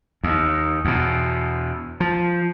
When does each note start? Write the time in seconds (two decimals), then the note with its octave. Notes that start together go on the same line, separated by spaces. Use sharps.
0.23 D#2
0.85 E2 B2
2.00 F3